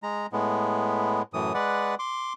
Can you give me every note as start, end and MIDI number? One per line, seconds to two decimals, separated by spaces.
0.03 0.26 56
0.03 0.26 82
0.33 1.22 45
0.33 1.22 56
0.33 1.22 59
1.33 1.53 42
1.33 1.53 45
1.33 1.53 52
1.33 1.53 87
1.54 1.95 56
1.54 1.95 71
1.54 1.95 74
1.54 1.95 78
1.99 2.33 84
1.99 2.33 86